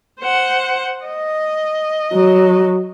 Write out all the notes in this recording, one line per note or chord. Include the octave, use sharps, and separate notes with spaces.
C5 F#5
D#5
F#3